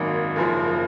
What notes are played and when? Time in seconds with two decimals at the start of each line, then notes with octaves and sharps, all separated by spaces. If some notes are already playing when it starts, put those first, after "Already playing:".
Already playing: G#1 F#2 D#3 F#3 A#3
0.36 F#1 F#2 F3